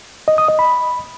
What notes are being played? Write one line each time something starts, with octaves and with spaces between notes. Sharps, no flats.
D#5
D#6
D#5
B5